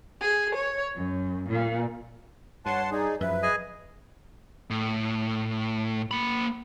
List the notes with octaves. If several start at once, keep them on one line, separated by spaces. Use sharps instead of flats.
G#4
C#5
F#2
A#2
G2 C#5 F#5 A5 C6
D#4 G#4 D5
F#2 F3 B4 E5
G#4 D#5 G#5
A2
A#3 B5